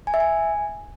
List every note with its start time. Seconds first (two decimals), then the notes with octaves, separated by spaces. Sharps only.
0.07 G#5
0.14 E5
0.20 G#5